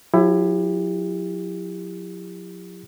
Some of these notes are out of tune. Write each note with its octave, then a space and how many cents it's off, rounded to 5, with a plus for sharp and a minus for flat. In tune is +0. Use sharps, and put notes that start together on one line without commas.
F#3 -40 E4 +20 G4 +30